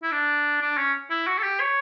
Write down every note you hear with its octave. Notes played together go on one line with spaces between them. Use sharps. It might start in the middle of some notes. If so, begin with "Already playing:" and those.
E4
D4
D4
C#4
E4
F#4
A4
G4
C#5